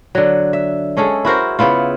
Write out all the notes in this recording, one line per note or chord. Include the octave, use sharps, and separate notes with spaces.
D3 F#3
E5
G#3 C#4 G#4 A4
E4 F#4 A#4 C5
C#3 B3 E4 F4